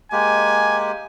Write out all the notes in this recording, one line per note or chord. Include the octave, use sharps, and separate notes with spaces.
G#3 A#3 G4 G#5